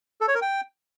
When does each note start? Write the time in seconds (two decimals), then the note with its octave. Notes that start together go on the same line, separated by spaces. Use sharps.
0.21 A4
0.28 C#5
0.35 A#4
0.42 G5